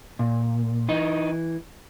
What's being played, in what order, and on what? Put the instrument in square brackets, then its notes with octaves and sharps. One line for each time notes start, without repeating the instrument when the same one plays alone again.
[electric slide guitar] A#2
E3 D#4